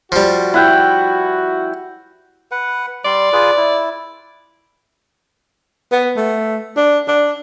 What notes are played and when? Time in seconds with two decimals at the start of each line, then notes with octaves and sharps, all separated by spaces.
0.12 F3 G3 F#4
0.54 E4 F#5 G5
2.51 B4 F#5
3.05 G3 D5 C6
3.33 F4 G#4 B4
3.57 E4
5.92 B3
6.17 A3
6.77 D4
7.08 D4